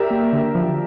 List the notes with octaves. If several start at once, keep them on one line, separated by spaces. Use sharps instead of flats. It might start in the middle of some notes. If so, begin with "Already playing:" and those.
Already playing: G4 A#4 D5 E5
A#3
D3
F3